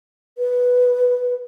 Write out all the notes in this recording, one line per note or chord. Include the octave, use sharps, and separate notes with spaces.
B4